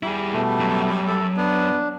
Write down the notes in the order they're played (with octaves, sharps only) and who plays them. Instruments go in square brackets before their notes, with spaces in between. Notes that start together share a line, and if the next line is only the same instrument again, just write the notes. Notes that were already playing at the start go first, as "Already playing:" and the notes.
[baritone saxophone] G3 [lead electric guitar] E4 G#4
[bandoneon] B2 A3
[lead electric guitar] F#2
[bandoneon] A4
[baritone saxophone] B3 [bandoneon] D4